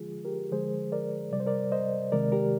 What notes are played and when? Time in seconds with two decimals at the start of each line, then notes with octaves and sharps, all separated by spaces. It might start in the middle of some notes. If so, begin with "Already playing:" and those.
Already playing: D3 F3 G#3 F4 G#4
0.25 G4 A#4
0.51 D3 F3 G#3 G#4 C5
0.92 A#4 D5
1.32 C3 G3 D5
1.40 C5
1.47 A#4 D5
1.72 C5 D#5
2.12 C3 D#3 G#3 A#4 D5
2.32 G4 A#4